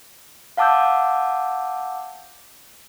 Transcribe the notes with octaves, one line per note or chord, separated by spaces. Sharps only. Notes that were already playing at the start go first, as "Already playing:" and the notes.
F5 F#5 A5 D6 E6 G6